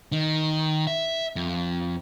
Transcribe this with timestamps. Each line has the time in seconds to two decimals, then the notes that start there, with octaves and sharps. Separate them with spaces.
0.12 D#3
0.87 E5
1.36 F2